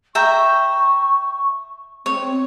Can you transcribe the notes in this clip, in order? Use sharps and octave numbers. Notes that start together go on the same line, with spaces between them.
E5 G5 A#5 C#6
C4 C#5